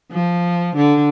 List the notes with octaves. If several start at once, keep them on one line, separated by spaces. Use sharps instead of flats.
F3
D3